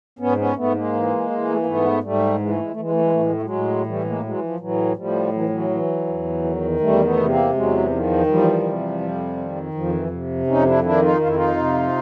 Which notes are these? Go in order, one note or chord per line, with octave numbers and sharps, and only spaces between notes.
G#2 B3 C#4
B3 C#4
G#2 A3 B3
G#3 A#3
E3
E3
A3
A#3
G#2 A3 B3
G#2 G3 A3
E3 G#3
A3
G#3
A3
E3 G#3
A3
G#3
A2 A3
G#3
A3
F#3 G#3
A2
E3 G3 A3
G#3 A#3
E3 F#3 G#3
F3
A2 E3 F#3
A2 F3 G3
E3 F#3
F3
E3 F#3
E3
E2
D#3
E2 G3 A3
A3 B3
C3
A#3 C4
E2 F#3 G#3
E3
D#3 F3
E2 F3 G3
C3
F2
D#3
F2 F3
E3
C3
F2 C#4 D#4
D4 E4
D#3 D4 E4
D#4 F4
F2 F4
E4
D#4 F4
C3